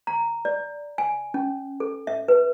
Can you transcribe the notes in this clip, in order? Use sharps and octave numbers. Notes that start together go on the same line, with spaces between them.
A#5
D5
G#5
C#4
A4
E5
B4